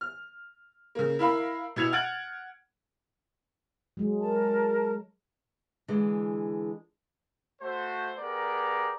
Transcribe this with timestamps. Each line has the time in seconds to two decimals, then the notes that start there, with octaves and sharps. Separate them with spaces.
0.01 F6
0.95 C#3 A#3
1.19 E4 A#4 F5 B5
1.76 B2 E4 G#6 C#7 F7
1.92 F#5 F6 G#6 A6 D7 F#7
3.97 F#3 G#3
4.20 A#4 A5
5.88 D3 E3 G#3
7.62 A3 F#4 C5
8.18 B3 G4 G#4 A#4 D5 A#5